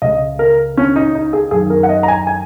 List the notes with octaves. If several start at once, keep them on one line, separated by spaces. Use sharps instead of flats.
C#2 C#3 D#5
A#4
C#4
D#4
D#4
G#4
F#2 D#3 G#4
A#4
F#5
D#5
A#5
G#5
G#5